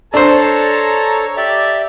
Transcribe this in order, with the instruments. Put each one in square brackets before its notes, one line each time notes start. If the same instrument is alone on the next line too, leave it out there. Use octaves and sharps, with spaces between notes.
[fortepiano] D4 C5 [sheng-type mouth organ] A4 [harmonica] C#5 A5 A#5
[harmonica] G4 [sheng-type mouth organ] D5 E5